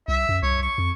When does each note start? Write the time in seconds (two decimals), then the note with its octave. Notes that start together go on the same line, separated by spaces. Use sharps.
0.08 C2 E5
0.29 F#2
0.43 C2 C#5
0.62 C#6
0.78 F2